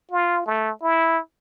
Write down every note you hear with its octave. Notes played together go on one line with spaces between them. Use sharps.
F4
A3
E4